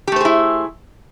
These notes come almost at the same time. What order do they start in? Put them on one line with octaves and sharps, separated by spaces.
G4 A3 C5 G#4 E4